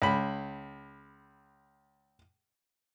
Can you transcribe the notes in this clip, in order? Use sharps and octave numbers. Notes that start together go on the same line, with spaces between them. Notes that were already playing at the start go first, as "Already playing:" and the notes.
C#2 B5